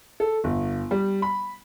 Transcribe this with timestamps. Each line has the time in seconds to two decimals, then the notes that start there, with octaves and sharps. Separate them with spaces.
0.20 A4
0.44 G1
0.91 G3
1.22 B5